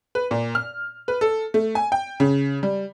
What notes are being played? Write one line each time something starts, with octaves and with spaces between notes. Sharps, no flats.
B4
A#2
F6
B4
A4
A3
G#5
G5
C#3
G3